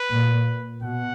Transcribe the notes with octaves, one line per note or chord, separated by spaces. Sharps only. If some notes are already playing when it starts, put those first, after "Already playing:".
Already playing: B4
A#2
B2 F#5